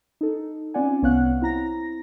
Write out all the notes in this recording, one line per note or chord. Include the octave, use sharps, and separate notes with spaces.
D#4 A4
C4 C#4 F4 D5 F#5 G#5
C2 B3 C#5 F5 F#5 F#6
C4 E4 A#5 A#6